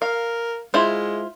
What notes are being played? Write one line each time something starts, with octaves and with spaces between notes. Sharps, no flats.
A#4 F5
G#3 E4 F4 C5